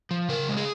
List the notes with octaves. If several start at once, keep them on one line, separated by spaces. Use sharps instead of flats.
F3
C#3 A#4
G#3
G#4